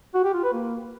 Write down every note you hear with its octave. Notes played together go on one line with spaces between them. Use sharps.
F#4
G4
F4
B4
A#3